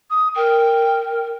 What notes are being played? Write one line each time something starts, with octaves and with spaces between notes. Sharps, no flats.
D#6
A#4 G5